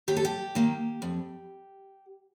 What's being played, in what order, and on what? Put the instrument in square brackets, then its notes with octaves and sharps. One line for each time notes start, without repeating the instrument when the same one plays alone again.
[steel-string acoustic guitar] D#2 G4
A4
G4
D#3 A#3
F2